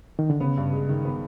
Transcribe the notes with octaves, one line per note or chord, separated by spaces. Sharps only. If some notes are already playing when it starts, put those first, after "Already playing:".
D#3
D3
C#3 B3
G2
G#3
D#3
B3